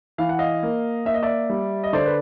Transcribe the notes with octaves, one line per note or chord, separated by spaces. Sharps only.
E3 F5
F#5
D#5 F5
A#3
A#3 E5
D#5
D5 E5
G3
D#5
D3 C5 D5
B4